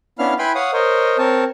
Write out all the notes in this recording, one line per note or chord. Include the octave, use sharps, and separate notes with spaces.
B3 C#4 D4 E4 F5 F6
E4 B4 G5 G#5 B5 C6
C#5 F5 F#5 D#6
A#4 C5 C#5 D#5
C4 A#4 C#5 A5